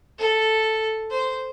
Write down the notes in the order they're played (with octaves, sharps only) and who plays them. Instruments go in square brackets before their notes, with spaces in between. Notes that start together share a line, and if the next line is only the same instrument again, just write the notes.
[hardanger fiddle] A4
C5